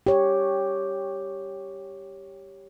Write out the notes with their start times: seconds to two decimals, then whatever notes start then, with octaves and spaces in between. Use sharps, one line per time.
0.07 G4 C#5